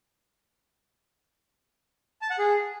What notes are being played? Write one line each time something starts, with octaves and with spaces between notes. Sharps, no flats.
A5
F#5
G#4